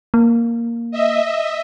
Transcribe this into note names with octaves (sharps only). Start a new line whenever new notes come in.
A#3
D#5 E5